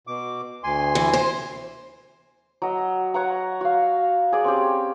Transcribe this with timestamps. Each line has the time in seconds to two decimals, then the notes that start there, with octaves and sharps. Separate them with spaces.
0.07 B2 D6
0.64 D2 G#5 C6
0.95 E3
1.13 C5
2.62 F#3 D#5
3.14 C#5 F#5 A#5
3.61 F#4 F5
4.33 G#4 D5
4.44 C4 C#4 G4